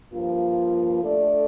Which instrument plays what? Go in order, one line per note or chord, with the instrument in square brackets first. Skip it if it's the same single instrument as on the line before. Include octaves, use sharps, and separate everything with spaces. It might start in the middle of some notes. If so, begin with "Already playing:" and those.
[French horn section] G2 F3 A#3 F4
A3 D4 A4 D5